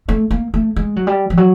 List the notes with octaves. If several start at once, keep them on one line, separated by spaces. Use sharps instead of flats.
A3
A#3
A3
G#3
F#3
G3
F3
F#3